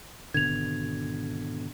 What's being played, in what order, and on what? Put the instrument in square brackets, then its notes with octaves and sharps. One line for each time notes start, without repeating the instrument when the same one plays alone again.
[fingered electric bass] G#1 B2 D3 [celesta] G#6 F7